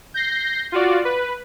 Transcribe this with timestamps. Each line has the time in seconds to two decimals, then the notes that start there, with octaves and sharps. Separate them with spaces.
0.14 G6 A#6 C7
0.72 F4 F#4 D5
1.05 B4